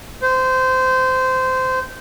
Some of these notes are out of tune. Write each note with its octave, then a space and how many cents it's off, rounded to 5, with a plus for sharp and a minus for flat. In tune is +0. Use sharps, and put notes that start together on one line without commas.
C5 -20